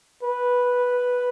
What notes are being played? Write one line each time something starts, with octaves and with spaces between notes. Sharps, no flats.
B4